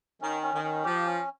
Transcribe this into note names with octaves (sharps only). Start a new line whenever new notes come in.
D#3 C#4
C#4
D#3
C#4
F3 G4
C#4